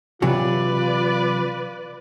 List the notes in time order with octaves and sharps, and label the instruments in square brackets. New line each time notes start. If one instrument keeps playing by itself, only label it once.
[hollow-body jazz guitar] C3 E3 F#3 [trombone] F4 [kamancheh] B4 D5